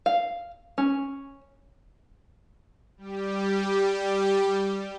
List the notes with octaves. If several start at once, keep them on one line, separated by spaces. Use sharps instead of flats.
F5
C#4
G3 G4